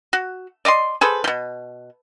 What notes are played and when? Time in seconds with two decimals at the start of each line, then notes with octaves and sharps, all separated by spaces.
0.13 F#4
0.65 D5 D#5 F5 C6
1.01 G#4 A4 B4 C5
1.24 B2 F3